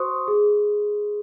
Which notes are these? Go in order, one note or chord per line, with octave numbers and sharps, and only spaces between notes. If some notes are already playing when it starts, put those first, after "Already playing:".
Already playing: F#4 C5 C6 C#6 D#6
G#4